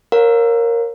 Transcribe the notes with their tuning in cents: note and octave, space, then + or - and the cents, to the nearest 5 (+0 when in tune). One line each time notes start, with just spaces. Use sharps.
A#4 +0 C#5 -25 F5 +30